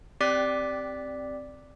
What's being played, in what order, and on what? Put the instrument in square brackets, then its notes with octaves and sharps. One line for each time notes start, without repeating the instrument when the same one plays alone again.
[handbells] C4 G4 D5 D6 F#6 B6